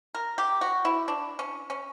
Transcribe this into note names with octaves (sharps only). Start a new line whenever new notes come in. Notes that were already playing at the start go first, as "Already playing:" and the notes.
A#4
G4
F#4
E4
D4
C#4
C#4